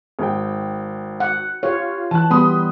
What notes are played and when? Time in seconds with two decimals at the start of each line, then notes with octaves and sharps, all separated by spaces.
0.19 G#1 G5
1.20 F#5
1.63 F4 G4 C#5
2.11 E3 A5 F#6
2.31 G3 B3 B5 C6 D#6